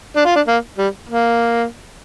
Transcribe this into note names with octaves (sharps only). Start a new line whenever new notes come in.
D4
F4
D4
A#3
G3
A#3